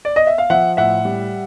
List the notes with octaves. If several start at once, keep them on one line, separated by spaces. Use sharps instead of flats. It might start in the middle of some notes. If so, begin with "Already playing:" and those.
D5
D#5
E5
F5
F3 E5 F#5
A2 E5 F#5
G3